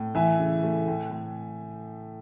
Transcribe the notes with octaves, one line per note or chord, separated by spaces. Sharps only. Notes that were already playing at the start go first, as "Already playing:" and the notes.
Already playing: A2
E3 E5 G#5
C#3
A3
A2
A2